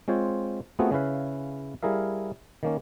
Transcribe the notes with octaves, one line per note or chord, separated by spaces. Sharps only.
G#3 C4 F4 C5 C#5
A3 B3 C4 F4 F#4 G#4
C#3 C#4 E4 B4 F5
G3 E4 G#4 A#4 F5
D#3 A#3 C#4